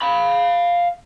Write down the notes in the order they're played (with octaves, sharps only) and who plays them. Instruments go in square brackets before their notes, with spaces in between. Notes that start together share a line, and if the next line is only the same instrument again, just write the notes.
[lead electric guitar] F5 B5